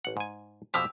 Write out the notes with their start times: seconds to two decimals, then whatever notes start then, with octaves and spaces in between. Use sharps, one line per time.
0.05 A1 F#5
0.17 G#2 G#5
0.74 F2 B2 F3 G4 E6